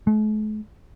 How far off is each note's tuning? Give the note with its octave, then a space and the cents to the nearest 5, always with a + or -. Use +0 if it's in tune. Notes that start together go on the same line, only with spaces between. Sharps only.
A3 -45